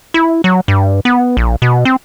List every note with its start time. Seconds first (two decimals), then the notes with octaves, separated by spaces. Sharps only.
0.14 E4
0.44 F#3
0.68 G2
1.05 B3
1.37 A#1
1.62 B2
1.85 C4